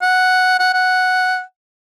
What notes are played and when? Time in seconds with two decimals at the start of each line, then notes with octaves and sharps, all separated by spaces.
0.02 F#5
0.59 F#5
0.73 F#5